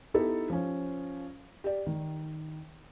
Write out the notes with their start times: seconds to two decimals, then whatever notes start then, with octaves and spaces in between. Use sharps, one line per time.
0.14 B3 D#4 E4 G4 A4
0.50 F3 C#4
1.64 G4 D5
1.87 D#3